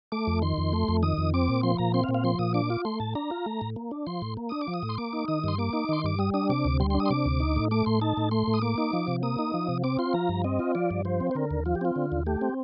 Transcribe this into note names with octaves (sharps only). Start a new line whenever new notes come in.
A3 D6
F2
D#3 C6
F2
A3
F2
D#3 D#6
F2
C4 D6
A#2
F3 C6
A#2 A#5
C4 C6
F5
A#2
F5
F3 C6
A#2 D#6
D4 D6
F4
A3 C6
A2 A5
D4 A#5
F4
A3
A2
A#3
D4
F3 C6
A2
A#3
D4 D#6
D6
F3
D#6
A2
C6
A#3 D6
D#4
D#3 D#6
G2 C6
A#3 D6
D#4
D#3 C6
G2 D6
G3 D#6
D4 D#6
C3 D6
D2
G3 C6
C6
D4
D#6
C6
C3 D6
D2
D#4
A2
A3 D6
A2 C6
D#4 A5
A2
A3 C6
A2
D#6
A#3 D6
D#4
F3
C3
A#3 D#6
D#4
F3
C3
C4 D6
F4 C6
F3 A#5
G2
C4 D#5
F4
F3 D5
G2
F3 C5
C4
C5
D3 A#4
D#2
F3 F4
G4
C4 F4
D3
D#2
A3 G4
C4